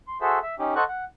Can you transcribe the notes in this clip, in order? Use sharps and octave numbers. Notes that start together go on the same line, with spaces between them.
C6
F#4 G#4 A4 C5 E5
E5
C#4 D#4 G4
A4 C5 D#5 F#5 C#6 F#6
F#5